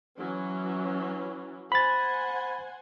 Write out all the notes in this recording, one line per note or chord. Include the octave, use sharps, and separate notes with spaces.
E3 F#3 C#4
C5 F#5 G#5 B5 A6